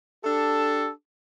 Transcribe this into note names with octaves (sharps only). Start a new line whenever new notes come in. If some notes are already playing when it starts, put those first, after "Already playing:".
D4 G4 A4